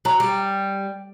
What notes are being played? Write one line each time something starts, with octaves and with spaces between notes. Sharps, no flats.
F#3 A#5
G3